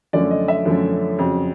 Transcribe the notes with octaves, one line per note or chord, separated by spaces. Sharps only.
F#2 D3 F3 A3 C#4 D5
D#5
E5
F#2 D3 F3 A3 C#4
F2 C#3 F#3